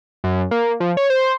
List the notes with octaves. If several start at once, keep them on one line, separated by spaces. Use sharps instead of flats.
F#2
A#3
F3
C#5
C5